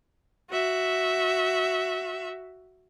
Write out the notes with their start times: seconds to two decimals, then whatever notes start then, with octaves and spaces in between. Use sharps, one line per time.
0.50 F#4 E5